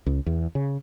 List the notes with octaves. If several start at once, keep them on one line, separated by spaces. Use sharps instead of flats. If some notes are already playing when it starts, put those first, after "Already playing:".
C#2
E2
C#3